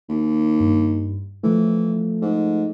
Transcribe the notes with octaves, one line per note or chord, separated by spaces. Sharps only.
D#2
G2
E3 F3 A3
G#2